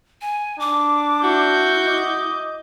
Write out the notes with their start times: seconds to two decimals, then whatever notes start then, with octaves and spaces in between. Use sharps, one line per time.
0.22 G#5
0.60 D4 D6
1.24 E4 F#4 G6
1.87 D#5 D6